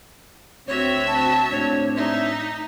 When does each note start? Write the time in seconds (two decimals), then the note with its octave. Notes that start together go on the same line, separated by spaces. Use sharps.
0.67 D2 C4 F#4 C#5 E5
1.07 A5
1.51 A2 C4 D4 C#5
1.96 D#4 E5